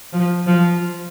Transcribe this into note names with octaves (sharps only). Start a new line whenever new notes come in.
F3
F3